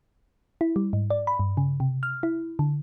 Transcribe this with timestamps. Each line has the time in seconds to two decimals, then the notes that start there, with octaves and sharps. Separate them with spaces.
0.61 E4
0.76 G3
0.93 G#2
1.10 D5
1.27 B5
1.39 G2
1.57 C#3
1.80 C3
2.03 F6
2.23 E4
2.59 D3